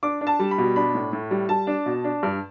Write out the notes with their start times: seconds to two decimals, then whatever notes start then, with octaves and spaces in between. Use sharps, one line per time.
0.03 D4 D6
0.21 D4
0.27 A5
0.39 G3
0.51 B5
0.58 B2
0.76 D4 B5
0.95 A2
1.13 A2
1.31 G3
1.49 G3 A5
1.67 D4
1.86 B2
2.04 D4
2.23 G2